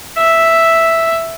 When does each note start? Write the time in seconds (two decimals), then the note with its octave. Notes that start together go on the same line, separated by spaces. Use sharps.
0.18 E5